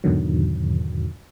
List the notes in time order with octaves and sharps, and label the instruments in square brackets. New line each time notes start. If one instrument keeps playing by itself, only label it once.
[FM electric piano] E2 G#2 B2 D3 D#3 F#3